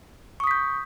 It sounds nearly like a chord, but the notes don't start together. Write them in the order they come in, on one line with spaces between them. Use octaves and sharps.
C#6 D#6 B6 G6